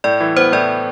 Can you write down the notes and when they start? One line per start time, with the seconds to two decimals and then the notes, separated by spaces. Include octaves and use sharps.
0.04 A2 D5
0.20 E3
0.36 B3 C5
0.52 A2 D5